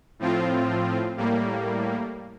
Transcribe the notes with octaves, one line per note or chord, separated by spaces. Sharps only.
A2 F3 C4 F4
A2 G3 A#3